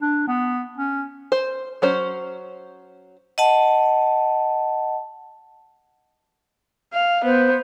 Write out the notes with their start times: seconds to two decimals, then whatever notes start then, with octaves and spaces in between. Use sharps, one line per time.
0.01 D4
0.28 B3
0.77 C#4
1.32 C5
1.82 F#3 C#4 C5
3.38 D#5 F#5 A5
6.93 F5
7.24 B3 C5